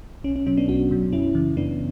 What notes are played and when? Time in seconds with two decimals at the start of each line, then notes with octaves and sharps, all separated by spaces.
0.24 B1 C#4
0.36 C#4
0.46 B2 F#3 C#4
0.57 B3 D4
0.68 B1 D4 F#4
0.91 B2 F#3
1.12 F#2 C#4 E4
1.35 C#3 E3
1.57 F#2 B3 D4